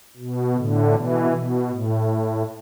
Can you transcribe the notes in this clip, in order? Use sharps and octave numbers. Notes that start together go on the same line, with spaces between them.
B2
A2 D3
B2 E3
B2
A2